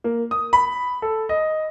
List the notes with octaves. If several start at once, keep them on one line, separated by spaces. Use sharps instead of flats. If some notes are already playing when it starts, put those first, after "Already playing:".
A#3
D#6
B5
A4
D#5